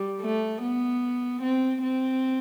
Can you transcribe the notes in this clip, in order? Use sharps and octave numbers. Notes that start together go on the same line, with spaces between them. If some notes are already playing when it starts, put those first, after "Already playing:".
Already playing: G3
A3
B3
C4
C4